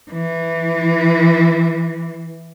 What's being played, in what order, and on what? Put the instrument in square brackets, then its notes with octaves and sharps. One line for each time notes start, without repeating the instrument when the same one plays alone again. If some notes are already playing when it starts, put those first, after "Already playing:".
[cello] E3